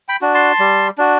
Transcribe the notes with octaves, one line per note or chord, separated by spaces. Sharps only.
G5 B5
D4 F#4
A5 C6
G3
D4 F#4